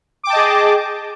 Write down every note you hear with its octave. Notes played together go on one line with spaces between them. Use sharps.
G#4 D#5 G5 A5 D6